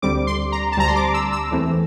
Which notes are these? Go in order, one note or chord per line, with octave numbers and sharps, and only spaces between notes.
D2 D3 G3 C4 D6
C6
A#5
A5
D2 D3 G3 C4 A#5
C6
D6
E6
E6
E2 E3 A3 C4